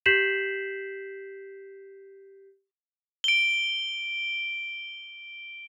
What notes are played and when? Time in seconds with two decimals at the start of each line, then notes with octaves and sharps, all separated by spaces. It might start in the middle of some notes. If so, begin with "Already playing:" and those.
0.06 G4 G6 B6 C7 E7 F#7
3.24 D7 G7